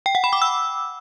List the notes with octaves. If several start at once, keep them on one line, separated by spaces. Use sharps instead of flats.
G5
F#5
B5
D6
E6